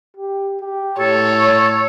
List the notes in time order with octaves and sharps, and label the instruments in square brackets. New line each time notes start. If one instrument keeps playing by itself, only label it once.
[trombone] G4
G4
[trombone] A2 [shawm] A4 [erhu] C#5